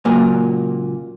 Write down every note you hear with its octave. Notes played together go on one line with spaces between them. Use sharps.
C#2 A#2 F#3 A#3 G#5